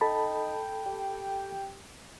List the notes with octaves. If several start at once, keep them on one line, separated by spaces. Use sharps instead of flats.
D#4 A4 G5 A5 B5
G4